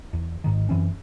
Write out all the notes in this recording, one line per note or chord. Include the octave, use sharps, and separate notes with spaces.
E2
G#1 G#2 D#3
F#2 E3 C4 C#4